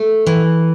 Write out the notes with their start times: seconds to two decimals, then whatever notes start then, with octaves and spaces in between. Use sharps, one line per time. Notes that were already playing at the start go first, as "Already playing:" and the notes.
Already playing: A3
0.26 E3